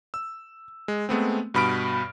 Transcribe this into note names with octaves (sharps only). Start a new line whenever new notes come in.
E6
G#3
G#3 A3 B3 C4
G2 B2 B5 F6 D7